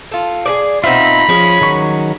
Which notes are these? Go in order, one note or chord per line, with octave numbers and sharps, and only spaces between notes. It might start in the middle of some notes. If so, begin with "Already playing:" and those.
F4 A4
G#4 B4 D5
B2 C4 D#4 F4 E5 B5
F3 G#3 C#4
D#3 F#3 C#6